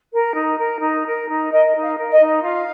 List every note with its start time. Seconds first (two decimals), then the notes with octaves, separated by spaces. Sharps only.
0.13 A#4
0.36 D#4
0.59 A#4
0.82 D#4
1.05 A#4
1.29 D#4
1.51 A#4 D#5
1.74 D#4
1.82 F5
1.97 A#4
2.12 D#5
2.20 D#4
2.43 F4 F5